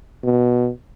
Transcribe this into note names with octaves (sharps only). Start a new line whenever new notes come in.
B2